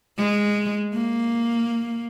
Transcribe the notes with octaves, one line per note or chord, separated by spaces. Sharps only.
G#3
A#3